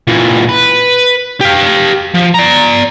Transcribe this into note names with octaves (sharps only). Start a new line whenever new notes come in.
A#2 E3
B4
G4 F5
F3
D5 A#5